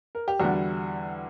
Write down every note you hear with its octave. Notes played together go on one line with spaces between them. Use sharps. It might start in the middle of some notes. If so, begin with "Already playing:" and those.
A#4
G4
E2 D3 G3 F#4